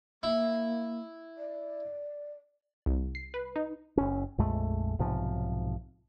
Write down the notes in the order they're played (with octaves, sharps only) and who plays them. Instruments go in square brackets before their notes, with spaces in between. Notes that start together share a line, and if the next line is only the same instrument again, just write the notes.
[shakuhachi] A#3 [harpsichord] E4
[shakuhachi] D5
[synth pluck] C2
C7
B4
D#4
[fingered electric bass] F#1 C#4
A#1 F2 G#3 A3
B1 G#2 C3 F3